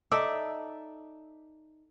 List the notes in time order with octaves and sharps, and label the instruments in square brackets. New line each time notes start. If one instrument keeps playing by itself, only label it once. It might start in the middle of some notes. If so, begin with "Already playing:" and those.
[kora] D#4 A4 D5 E5